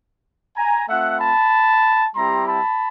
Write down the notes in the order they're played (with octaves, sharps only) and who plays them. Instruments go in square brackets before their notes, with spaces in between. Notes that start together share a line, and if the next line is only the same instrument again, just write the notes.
[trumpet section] G#5 A#5
A3 C4 F4 E5 F#5
A5 B5
G3 C4 E4 G4 A#5 C6
A5 B5